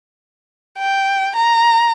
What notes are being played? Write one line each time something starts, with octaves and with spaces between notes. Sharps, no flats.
G5
A#5